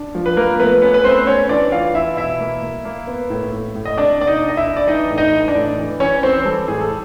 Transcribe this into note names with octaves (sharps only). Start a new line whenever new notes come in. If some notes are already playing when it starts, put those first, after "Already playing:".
Already playing: D4
F3
B4
F3 A#3 A#4
A3 B3 B4
B3 C#4 B4
B4
A3 C4 C5
B3 C#4 C#5
E3 D4 D5
E3 F4 F5
E3 E4 E5
B2 E4 E5
A#3
A#3
A#3
B3
A2
A2
A2
D#5
C3 D4 D5
A#3 D5
D#4 D#5
D4
D#5
E4 E5
D4
D5
E3 D#4 D#5
A2
D#4 D#5
E3
D4 D5
A2
E3
E3 C#4 C#5
E3 C4 C5
G3 A4
A2 G#4
A4